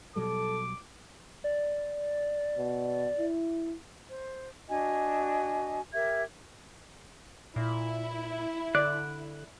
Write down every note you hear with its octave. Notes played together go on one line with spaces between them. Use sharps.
B2 F#3 G3 A4 D6
D5
B2
E4
C5
D4 F#4 D#5 G#5
G4 A#4 E5 G#6
A#2 E4
D3 D5 F#6